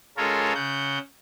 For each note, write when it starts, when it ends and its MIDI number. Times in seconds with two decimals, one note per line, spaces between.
0.17 0.53 56
0.17 0.53 61
0.17 0.53 65
0.17 0.53 69
0.17 0.53 70
0.17 0.53 73
0.55 0.98 49
0.55 0.98 78
0.55 0.98 91